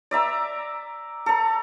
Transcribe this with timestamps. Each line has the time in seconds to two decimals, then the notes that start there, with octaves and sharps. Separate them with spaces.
0.11 D5 E5 A#5 E6
1.26 A4 A#5